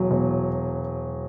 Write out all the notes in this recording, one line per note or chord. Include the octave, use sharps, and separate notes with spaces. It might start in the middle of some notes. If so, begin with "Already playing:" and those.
Already playing: E1 F#3
E1